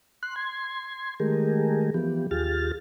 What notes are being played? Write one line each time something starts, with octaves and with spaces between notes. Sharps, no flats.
C6 F#6
C6 G#6
D#3 G#3 A3 G4 G#4 A#4
E3 F3 B3 G4
D#2 F4 G4 G#4 F6 A6